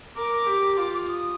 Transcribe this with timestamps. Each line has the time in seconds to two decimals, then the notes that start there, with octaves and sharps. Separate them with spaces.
0.16 A#4 D6
0.47 G4
0.77 F4
1.08 D#6